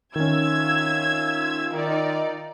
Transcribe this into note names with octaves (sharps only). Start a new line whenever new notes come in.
D#3 C#4 F4 E5 E6 G#6
D#3 D#4 D5